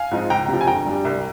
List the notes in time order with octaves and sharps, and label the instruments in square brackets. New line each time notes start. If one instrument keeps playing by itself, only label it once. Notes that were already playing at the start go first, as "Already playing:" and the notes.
Already playing: [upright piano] F5 G#5
G#2 F3 C4 D#4
C#2 G5 A#5
C3 F3
G#5
G1 G5 A#5
G2 G3
C2